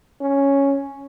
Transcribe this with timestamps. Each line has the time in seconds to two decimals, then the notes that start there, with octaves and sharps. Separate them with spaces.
0.21 C#4